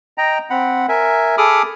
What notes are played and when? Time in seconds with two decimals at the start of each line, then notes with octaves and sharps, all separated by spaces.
0.18 D#5 G5 A#5
0.50 C4 F#5 B5
0.89 A#4 E5 G#5
1.38 G#4 A4 B5 D6 D#6 F6